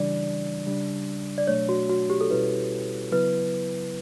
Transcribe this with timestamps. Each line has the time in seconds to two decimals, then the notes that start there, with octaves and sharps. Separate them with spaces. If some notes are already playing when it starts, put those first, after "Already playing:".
Already playing: C#3 E3 G3 D4 D5
0.66 C#3 G3 D4
1.38 D5
1.47 B2 F#3 A3 D4 C#5
1.69 F#4
1.89 F#4
2.10 G4
2.21 A4
2.31 B2 G3 C#4 E4 B4
3.12 C#3 F#3 B3 E4 B4